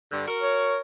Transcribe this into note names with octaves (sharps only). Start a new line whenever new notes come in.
G2 D3
F#4 A#4
C#5